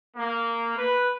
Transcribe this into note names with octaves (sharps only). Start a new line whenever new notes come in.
A#3
B4